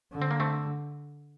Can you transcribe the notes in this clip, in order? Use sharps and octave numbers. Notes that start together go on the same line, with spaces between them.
D3
C4
A#3
A3 C4